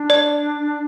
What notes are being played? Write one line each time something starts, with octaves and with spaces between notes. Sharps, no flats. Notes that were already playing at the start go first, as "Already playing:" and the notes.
Already playing: D4
D5